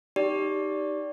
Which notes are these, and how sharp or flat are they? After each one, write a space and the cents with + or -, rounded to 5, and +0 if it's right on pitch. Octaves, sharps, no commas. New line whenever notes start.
D#4 +0 G4 -5 D5 -15